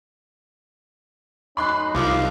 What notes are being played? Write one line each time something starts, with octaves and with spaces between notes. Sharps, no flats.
F#2 C#4 D#4 B5 C6 F#6
C2 F3 F#3 D#4 C#5 F5 D6